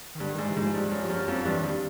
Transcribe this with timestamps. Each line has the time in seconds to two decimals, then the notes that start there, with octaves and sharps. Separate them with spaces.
0.15 D#3
0.20 G2 D3
0.34 G#2 D#3
0.48 E3
0.57 G#2 F3
0.74 G2 F3
0.91 F#2
1.10 F#2
1.27 F2 F3
1.45 G2 E3
1.62 G2 D#3